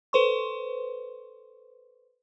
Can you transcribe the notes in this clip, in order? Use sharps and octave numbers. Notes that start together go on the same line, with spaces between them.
A4 B4 C5 C6 C#6